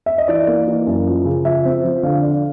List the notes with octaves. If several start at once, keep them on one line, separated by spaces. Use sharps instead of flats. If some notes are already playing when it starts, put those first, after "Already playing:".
E5
D#5
E3 D5
A#3
E3
F#2
F3
C#3
F3 E5
C4
F3
D3 F5
D4